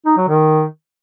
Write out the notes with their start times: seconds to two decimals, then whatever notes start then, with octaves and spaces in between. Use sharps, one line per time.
0.06 D#4
0.17 F#3
0.28 D#3